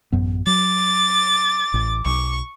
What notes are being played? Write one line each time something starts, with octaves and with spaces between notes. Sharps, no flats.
A1 F#2 B3
F#3 D6 A6
A1
B1 C#6